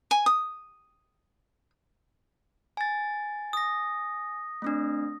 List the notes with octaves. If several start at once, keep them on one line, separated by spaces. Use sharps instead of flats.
G#5
D#6
G#5 A6
D#6 A#6
A3 C4 D4